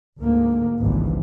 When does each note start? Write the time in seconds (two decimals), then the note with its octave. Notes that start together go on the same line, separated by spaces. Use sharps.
0.20 D2 G#2 A#3
0.80 G#1 C#2 G2 E3